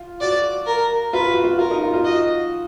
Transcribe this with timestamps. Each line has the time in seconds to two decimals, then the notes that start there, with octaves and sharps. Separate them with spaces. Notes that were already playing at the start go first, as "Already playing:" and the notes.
Already playing: F4
0.21 F#4 D5
0.67 A#4
1.13 F4 B4
1.29 F#4
1.44 F4
1.59 F4 A#4
1.71 D#4
1.81 F4
1.94 F4
2.05 F#4 D#5